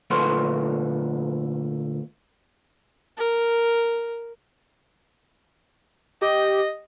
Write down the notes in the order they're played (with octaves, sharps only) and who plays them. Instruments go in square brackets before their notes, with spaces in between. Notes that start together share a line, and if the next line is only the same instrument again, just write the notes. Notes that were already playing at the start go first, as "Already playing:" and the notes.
[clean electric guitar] D2 A#2 A4 B4 C#5 C6
[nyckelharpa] A#4
[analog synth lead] G4 [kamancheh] D#5